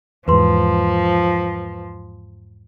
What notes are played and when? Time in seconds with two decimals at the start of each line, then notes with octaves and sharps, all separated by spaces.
0.28 E2 G#2 F3 B4 C6